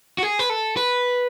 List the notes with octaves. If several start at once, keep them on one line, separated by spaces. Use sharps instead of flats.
F#4
G#4
B4
A4
B4